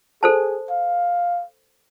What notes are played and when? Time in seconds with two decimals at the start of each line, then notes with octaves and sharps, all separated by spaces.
0.23 G#4 A4 C5 A5
0.70 F5